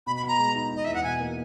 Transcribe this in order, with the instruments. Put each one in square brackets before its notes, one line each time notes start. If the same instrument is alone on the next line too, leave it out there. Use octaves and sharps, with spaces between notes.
[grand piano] B2 [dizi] B5
[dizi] B5
[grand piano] B2 [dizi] A#5
[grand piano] G#3
D#4
[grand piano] D#4 [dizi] D#5
[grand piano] E2 [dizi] E5
[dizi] F#5
[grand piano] B2 [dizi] G#5
[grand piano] A#3